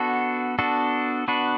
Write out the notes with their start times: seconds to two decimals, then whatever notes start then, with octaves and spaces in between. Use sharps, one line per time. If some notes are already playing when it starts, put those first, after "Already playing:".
Already playing: B3 D4 F#4 A4
0.59 B3 D4 F#4 A4
1.28 B3 D4 F#4 B4